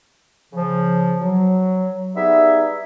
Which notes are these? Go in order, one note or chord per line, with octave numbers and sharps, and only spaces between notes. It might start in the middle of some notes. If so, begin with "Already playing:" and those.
C#3 F3
F#3
G3 B3 D#4 G#4 E5